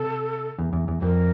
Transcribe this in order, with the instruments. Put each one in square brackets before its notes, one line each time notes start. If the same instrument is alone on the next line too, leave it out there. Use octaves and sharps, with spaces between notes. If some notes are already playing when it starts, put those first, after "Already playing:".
Already playing: [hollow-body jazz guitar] C3 [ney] A4
[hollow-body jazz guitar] E2
E2
E2
[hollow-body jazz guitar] F2 [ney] A#4